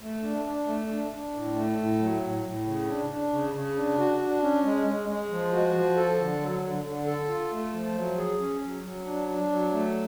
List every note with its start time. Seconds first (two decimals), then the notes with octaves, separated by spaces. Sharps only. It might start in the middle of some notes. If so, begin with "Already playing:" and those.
0.01 A3
0.23 D4
0.45 D4
0.67 A3
0.89 D4
1.11 D4
1.34 A2
1.55 A3
1.78 A2
1.99 F#3
2.22 A2
2.44 A2
2.66 C#3
2.88 D4
3.10 D4
3.32 C#3
3.54 C#3
3.76 D4
3.98 F#4
4.20 D4
4.42 C#4
4.64 G#3
4.87 G#3
5.09 G#3
5.31 F3
5.52 F#4
5.75 F3
5.96 A4
6.18 D3
6.41 F#3
6.63 D3
6.84 D3
7.07 A4
7.29 F4
7.51 A3
7.73 F3
7.95 F#3
8.17 G#4
8.39 C#4
8.61 F#3
8.83 F#3
9.05 D4
9.28 D4
9.50 F#3
9.72 A3